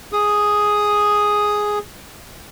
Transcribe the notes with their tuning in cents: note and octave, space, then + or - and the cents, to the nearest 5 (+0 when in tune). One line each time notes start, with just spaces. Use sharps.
G#4 +0 D#6 +0